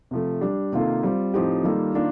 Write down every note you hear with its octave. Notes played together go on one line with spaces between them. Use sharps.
C3 F3 A3
G3 D4 G4
C3 D#3 A#3 F4 A4
G3 C4 F4
A2 F3 C4 D#4 G4
D#3 G3 A#3 F4 A4
D#3 A#3 D4 F4